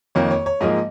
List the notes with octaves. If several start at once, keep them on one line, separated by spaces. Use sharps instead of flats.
F2 D#3 A#3 C#5
C#5
C#5
G#2 F3 A#3 D#5